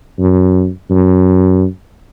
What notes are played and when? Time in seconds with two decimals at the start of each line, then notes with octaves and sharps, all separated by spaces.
0.19 F#2
0.90 F#2